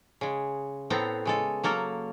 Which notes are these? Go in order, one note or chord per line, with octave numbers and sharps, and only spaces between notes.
C#3 G#3
A2 B3 C4 A4 A#5
C#3 G#3 A4
F#3 A#3 A4 A#4